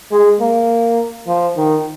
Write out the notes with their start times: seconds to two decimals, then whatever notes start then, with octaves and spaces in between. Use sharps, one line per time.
0.12 G#3
0.40 A#3
1.27 F3
1.56 D#3